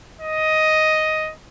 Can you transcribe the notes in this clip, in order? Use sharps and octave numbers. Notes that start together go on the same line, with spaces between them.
D#5